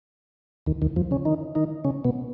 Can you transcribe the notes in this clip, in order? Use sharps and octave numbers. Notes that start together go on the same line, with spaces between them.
D#2 D#3
D#2 D#3
F2 F3
C#3 C#4
D#3 D#4
D#3 D#4
C#3 C#4
B2 B3